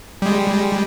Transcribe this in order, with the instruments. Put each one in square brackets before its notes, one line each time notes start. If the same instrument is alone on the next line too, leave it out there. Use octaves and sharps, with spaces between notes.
[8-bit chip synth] G3 G#3